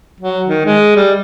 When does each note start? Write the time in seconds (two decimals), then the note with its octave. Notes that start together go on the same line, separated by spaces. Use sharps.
0.20 F#3
0.47 D#3
0.65 G#3
0.96 G3